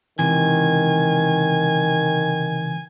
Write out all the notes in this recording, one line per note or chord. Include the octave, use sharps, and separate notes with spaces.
C#2 C3 D#3 E3 G#5